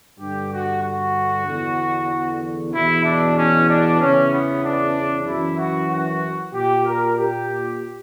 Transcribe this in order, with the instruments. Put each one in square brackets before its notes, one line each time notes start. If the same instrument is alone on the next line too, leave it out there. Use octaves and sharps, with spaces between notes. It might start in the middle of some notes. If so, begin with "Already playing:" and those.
[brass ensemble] G2 D3 G4
F#4
F#4
E2 D3
E2 B2 E4
D4
C#4
D4
E2 C#3 E3 C#4
B3
D4
F#2 E3 E4
F#4
F#4
A#2 G4
A#4
G4